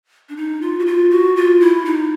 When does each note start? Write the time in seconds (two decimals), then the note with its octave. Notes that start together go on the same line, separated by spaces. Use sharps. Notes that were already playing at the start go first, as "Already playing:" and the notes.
0.29 D4
0.37 D#4
0.62 F4
0.79 F#4
0.86 F4
1.10 F#4
1.36 F4
1.60 E4
1.85 D#4